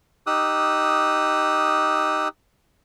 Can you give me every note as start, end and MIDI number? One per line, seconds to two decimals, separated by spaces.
0.27 2.28 63
0.27 2.28 67
0.27 2.28 87
0.27 2.28 88
0.27 2.28 90